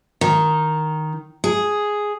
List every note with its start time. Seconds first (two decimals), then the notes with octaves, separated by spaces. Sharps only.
0.21 D#3
1.44 G#4